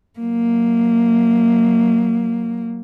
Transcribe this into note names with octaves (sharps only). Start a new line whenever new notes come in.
F#3 A#3